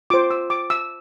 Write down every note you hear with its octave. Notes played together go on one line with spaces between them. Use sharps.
F4 C5 D6
E6
D6
E6